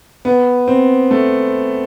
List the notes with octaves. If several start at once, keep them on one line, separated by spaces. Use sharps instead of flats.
B3
C4
A3